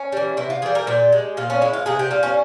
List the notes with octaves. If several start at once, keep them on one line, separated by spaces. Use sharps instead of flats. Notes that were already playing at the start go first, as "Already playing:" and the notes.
Already playing: C#4
E3 G3
C3 E4
F4
E3 G3 G#4
A#4
A#2 G4
G#3
A#2 F4
C#4
G#3 E4
F4
C3 G#4
G4
G3 F4
C#4